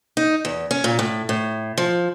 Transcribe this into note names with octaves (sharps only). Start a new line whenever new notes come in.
D#4
E2
C#4
A#2
A2
A2
F3